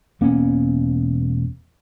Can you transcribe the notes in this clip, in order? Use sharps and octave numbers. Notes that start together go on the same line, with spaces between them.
E1 A#3 B3 C#4